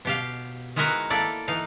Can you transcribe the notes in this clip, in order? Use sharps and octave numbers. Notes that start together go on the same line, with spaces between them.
B2 G4 F5
D#3 G#3 E4 F#4 A#4 B4
A#3 E4 A4 D5
E3 D#4 F5